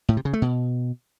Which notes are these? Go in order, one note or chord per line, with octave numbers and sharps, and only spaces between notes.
A2
C3
C#3
A3
B2